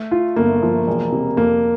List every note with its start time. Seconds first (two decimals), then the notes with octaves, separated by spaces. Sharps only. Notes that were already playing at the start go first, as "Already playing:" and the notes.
Already playing: A3
0.11 F4
0.36 G1 A#3
0.62 F3
0.87 E1
1.12 C3
1.37 F2 A#3